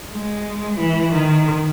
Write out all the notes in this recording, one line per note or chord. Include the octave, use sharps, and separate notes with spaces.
G#3
E3
D#3